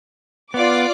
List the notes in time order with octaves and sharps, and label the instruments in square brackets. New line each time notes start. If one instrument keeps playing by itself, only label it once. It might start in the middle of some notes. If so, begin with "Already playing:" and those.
[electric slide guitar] B3 [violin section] F4 D5 D6